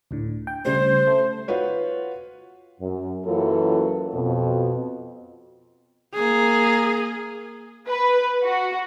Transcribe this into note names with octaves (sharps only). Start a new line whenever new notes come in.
D2 A2 D3
G5
C#3 G3 A3 C5
A3
F4 F#4 B4 C#5
F#2
F#2 E3 F#3 A#3 F4 A4
F2 B2
A#3 G#4
B4
F#4